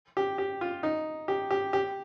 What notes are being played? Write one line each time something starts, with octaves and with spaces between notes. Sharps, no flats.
G4
G4
F4
D#4
G4
G4
G4